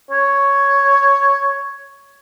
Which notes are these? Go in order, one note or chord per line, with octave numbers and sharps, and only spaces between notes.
C#5